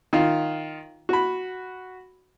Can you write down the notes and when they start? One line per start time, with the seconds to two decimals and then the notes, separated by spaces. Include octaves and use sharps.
0.13 D#3 F4
1.09 F#4 B5